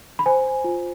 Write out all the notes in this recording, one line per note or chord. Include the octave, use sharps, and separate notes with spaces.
B5
C5 G#5
F4